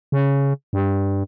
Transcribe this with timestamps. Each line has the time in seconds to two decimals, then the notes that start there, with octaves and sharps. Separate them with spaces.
0.12 C#3
0.73 G2